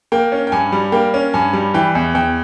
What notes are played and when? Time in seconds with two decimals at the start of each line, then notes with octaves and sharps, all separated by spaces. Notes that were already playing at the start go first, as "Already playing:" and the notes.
0.12 A#3 G5
0.32 C#4
0.47 G5
0.52 G2 G#5
0.72 G3
0.92 A#3 G5
1.14 C#4
1.34 G2 G#5
1.53 G3
1.74 E3 G5
1.95 E2
2.15 E2 G5